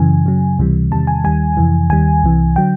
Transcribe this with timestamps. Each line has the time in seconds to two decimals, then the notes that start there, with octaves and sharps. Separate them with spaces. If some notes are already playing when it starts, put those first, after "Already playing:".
Already playing: F#2 C#3 E3 G#5
0.25 F#2 C#3 F#3
0.58 C#2 C3 E3 G3
0.91 E2 C3 D#3 G3 A5
1.07 G#5
1.24 D#2 D#3 G3 G#5
1.57 F2 C3 E3
1.90 D#2 D#3 G3 G#5
2.23 C2 C3 E3
2.56 D3 F#3 G5